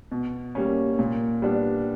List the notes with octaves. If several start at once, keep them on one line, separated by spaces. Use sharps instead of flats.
B2
G3 A#3 C#4
A#2
G3 B3 D4